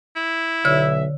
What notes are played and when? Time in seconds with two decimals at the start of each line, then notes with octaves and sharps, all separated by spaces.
0.16 E4
0.65 B1 D3 C#5 E5 E6